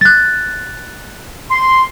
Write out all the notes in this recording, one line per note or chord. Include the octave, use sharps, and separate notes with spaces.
F#6 A6
C6